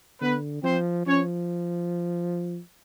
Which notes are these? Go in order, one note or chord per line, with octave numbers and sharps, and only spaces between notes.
D3 B3 B4
F3 C4 C5
F3 C#4 C#5